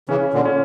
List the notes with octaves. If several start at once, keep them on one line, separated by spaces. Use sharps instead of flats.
C#3 E3 C#4
A#2 D3
C#4